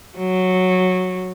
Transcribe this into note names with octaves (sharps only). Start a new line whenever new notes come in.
F#3